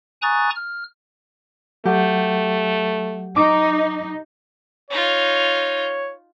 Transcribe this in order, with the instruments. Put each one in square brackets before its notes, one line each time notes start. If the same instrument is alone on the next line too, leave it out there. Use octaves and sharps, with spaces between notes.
[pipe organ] G#5 A#5 C#6 D#6 F#6 A6
F6
[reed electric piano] F#3 F#5 [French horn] A3 [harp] G4
[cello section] D#4 [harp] D6
[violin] D#4 F4 [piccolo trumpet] C#5